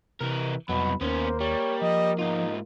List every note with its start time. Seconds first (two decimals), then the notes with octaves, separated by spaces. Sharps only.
0.21 C3 E3 A#4
0.69 C2 F2 B2 F#3 B5
1.01 D#2 A#3 B3 C#4 C5
1.40 G3 C#5
1.82 F3 D#5
2.19 G#2 D#4 F4